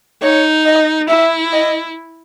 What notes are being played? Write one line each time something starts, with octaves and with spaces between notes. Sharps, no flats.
D#4 C#5
D#5
E4 E5
D#5